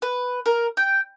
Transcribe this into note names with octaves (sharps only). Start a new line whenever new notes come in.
B4
A#4
G5